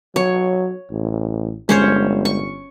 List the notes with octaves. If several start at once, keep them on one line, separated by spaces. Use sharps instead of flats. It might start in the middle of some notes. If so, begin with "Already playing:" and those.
F#3 C#5
A1
G1 G#3 C#4 C5 C#5
C#6